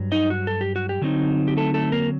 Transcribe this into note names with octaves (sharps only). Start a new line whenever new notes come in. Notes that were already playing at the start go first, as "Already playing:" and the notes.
Already playing: G2 F#3
D#4 D#5
F#4
A4
G4
F#4
G4
D3 F#3 C4 D#4
G4
A3 A4
A3 A4
A#3 A#4